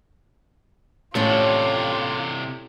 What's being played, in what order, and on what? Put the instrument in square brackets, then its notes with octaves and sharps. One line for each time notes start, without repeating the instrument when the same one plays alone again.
[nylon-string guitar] A2 [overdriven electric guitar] C3 D4 [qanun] C#4 A4 C#5 [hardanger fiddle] F4 G4